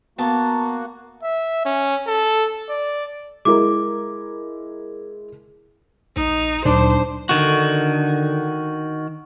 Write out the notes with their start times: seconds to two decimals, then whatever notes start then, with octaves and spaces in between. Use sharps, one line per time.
0.19 A#3 B3 F#4 A5
1.23 E5
1.65 C#4
2.07 A4
2.69 D5
3.45 G#3 E4 A#4 D6
6.17 A#1 D#4
6.65 D2 A#2 F#3 D4 D#4 C5
7.29 D3 D#3 F#4